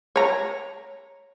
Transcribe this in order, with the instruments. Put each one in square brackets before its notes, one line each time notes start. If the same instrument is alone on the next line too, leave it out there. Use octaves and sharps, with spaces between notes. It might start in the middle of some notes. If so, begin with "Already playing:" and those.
[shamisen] C#5 A#5